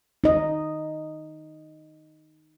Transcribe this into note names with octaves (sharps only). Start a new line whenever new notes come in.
D#4 D#5